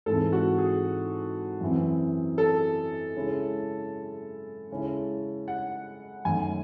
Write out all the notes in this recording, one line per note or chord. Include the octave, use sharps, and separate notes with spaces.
G#2 E3 G#3 C4 E4 A4
F#4
G#4
F#2 E3 C4
A4
C#3 G#3 C#4 E4
C#3 G#3 C#4 E4
F#5
F#2 D#3 A3 C#4 G#5